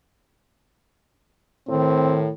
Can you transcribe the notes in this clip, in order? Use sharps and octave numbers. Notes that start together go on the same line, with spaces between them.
A2 D#3 C4